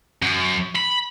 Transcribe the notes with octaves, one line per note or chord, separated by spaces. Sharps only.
F#2
B5